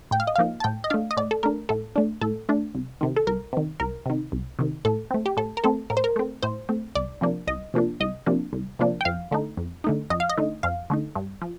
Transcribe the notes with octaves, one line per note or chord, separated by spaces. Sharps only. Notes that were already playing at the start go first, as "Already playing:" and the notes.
A2 G5
F5
D#5
F3 A#3 D#4 F5
A5
A2 G5
D#5
A3 D4 F5
D#5
A2 D5
A4
A3 D4 A#4
A2 A4
A3 D4
A2 A4
A3 D4
C2
C3 D#3
A4
C2 A#4
C3 D#3
C2 A#4
C3 D#3
C2
C3 D#3
A2 A4
A3 C4
G4
A2 A4
A#4
A3 C4 A4
A2 A#4
C5
A#4
A3 C4
A2 C5
A3 C4
C2 D5
C3 F3 A#3 D4
C2 D#5
C3 F3 A#3 D4
C2 D#5
C3 F3 A#3 D4
C2
C3 F3 A#3 D4
G5
F2 F5
D3 A3 D#4
F2
D3 A3 D#4
F2 D#5
F5
D#5
D3 A3 D#4
F2 F5
D3 A3 D#4
G2
F3